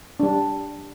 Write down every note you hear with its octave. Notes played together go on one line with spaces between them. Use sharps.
G3 D4